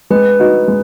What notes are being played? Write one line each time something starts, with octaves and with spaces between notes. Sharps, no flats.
G#3 B4
D#4 F#4
G#3